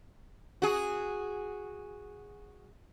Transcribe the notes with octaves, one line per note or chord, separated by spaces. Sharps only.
F#4 G#4